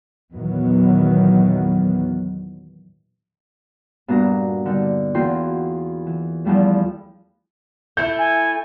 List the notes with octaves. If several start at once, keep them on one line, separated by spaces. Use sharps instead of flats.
E2 A#2 D#3 F#3 B3
G2 A#2 B3 D4 F#4 A#5
D3 G3 D#4
E2 A#3 F4 F#4 G5 C6
E3
E2 E3 F3 G3 A3 D4
A3 E4 G6
G#5